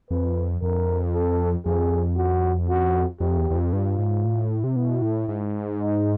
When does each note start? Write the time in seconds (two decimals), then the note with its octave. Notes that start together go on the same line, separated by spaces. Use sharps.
0.11 F2 B4
0.62 F2 A#4
1.14 A4
1.66 F2 G#4
2.17 F#4
2.69 F#4
3.20 F2 G4
3.38 E2
3.50 E2
3.55 F2
3.73 G2 F4
3.99 G#2
4.25 A2
4.64 C3
4.76 B2 E4
5.02 A2
5.28 G#2
5.80 D#4